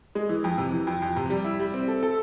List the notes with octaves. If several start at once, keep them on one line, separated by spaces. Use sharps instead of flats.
G#3
E3
F2
C3
E3
F2
F2
C3
G3
E4
G3
C4
A4
A4